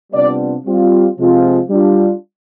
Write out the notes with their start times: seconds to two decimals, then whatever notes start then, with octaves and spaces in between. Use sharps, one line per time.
0.13 C3 G3 B3 D4 F4 D5
0.65 G3 C4 F4
1.18 C3 F3 G#3 C4 F4
1.70 G3 D4 F4